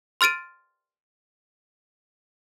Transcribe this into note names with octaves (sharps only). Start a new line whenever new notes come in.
C6 F6 A6 D7 D#7